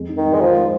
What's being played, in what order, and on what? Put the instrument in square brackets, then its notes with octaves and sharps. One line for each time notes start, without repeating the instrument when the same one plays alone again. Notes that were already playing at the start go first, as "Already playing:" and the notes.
Already playing: [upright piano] F2 G#3
D#4
[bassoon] D#3
[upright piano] G#2
[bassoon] G#3
[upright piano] D#3 [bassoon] F3
[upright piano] G#3